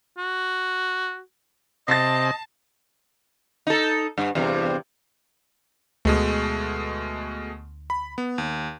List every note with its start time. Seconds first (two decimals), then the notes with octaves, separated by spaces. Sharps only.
0.18 F#4
1.88 C3 D#5 A5 A6 A#6 C7
3.67 D#4 A4
4.18 G2
4.35 E2 G2 C3
6.05 D2 B2 G#3 A3
7.90 B5
8.18 B3
8.38 D#2